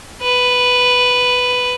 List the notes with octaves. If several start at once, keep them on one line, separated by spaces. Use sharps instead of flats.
B4